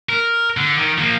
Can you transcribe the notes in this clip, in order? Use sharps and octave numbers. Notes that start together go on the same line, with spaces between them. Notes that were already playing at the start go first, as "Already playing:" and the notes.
A#4
D3
D#3
F3 A#3